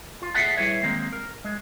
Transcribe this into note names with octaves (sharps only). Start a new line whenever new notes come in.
F4
G#4 A4 D5 E5 F#5 A5
G3 E4 G#4 B4 C#5 E5
D#3 G#3 A#3 C4
A#4
G#3